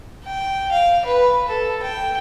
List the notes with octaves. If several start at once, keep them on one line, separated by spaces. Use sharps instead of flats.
G5
F5
B4
A4
G5